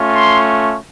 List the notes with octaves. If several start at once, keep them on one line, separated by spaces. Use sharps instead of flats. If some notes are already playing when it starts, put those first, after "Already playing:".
Already playing: A3 C#4 F4
C6